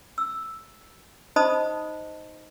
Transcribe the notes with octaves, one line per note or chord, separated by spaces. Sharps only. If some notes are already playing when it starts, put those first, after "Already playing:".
E6
D#4 C5 D#5 A5 B5 D#6